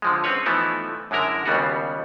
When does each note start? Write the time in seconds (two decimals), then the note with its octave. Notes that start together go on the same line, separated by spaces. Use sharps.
0.02 D3 F3 G#3
0.24 C4 C#4 B4 C#5
0.46 E3 F3 A3 B3 D#4 E4
1.11 F#2 D3 G#3 E4 A#4 A#5
1.46 D#2 C#3 G3 B3 F4 F#4